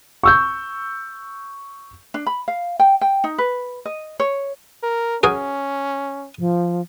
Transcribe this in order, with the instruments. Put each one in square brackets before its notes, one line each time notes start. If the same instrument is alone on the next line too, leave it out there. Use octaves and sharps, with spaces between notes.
[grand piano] C#6 E6 G6
[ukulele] D4
B5
F5
G5
G5
D#4
B4
D#5
C#5
[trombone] A#4
[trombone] C#4 [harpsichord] F#4 G#4 A#4
[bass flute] F3